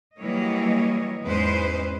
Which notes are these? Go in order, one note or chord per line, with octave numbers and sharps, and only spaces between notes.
E3 F#3 G3 A#3 C#5 D#5
E2 G#2 G#3 C#4 B4 C5